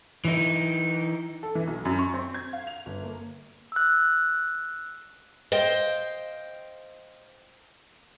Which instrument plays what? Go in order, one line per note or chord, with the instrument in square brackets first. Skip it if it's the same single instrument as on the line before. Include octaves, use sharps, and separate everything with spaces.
[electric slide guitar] E3 D#4
[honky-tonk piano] A4
E3
B1
F#2
C#6
C4
G#6
F5
F7
G1
A#3
[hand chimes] E6 F#6
[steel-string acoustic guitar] C5 D#5 F5 G5